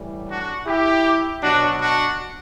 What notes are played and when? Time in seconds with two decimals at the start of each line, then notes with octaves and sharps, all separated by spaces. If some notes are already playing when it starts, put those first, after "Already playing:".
Already playing: A2 E3 G3
0.28 D4 F#4
0.66 E4 G4
1.42 B2 F#3 D4 F#4
1.80 D4 F#4